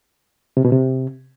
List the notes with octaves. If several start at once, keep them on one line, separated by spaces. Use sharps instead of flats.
C3
B2
C3